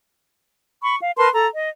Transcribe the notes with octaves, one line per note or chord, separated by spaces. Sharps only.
B5 C#6
F5
A#4 B4 A5 C6
A4 A#5
D#5